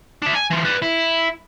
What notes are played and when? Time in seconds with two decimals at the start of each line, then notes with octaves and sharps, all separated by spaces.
0.22 D4 E5
0.35 G#5
0.51 E3 F4
0.65 B4 D5
0.82 E4